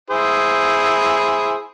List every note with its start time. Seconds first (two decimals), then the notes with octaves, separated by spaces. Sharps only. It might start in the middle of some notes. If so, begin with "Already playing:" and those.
0.10 E4 G#4 C5